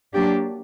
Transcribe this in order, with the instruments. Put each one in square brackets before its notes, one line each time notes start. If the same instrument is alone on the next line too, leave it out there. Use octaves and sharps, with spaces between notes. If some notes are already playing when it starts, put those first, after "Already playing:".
[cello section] F#3 A#3 D4 G4